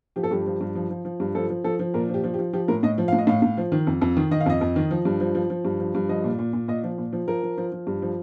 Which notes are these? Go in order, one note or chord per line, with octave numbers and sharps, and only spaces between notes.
F3 G4
A4
G2 G4
F3
G2
F3
F3
F3
G2
F3 A4
F3
F3 A4
F3
A#2 A#4
F3 G4
F3
G4
F3
F3 G4
A2 A#4
A2 D#5
F3
A2 F5
D#5
A2 F5
A2
F3
D#3
F2
F2
D#3
D#3 D#5
F5
F2 D#5
F2
D#3
F3
G2
F3
F3
F3
G2
F3
G2
F3 D#5
A#2
A#2
A#2
A#2 D#5
F3
A#2
F3
F3 A#4
F3
F3
F3
G2
F3